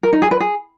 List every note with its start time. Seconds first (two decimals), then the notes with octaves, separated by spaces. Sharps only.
0.03 A#4
0.13 D#4
0.22 G#4
0.31 B4
0.40 G#4